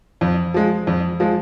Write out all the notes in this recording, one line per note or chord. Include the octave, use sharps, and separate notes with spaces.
F2
F3 G#3
F2
F3 G#3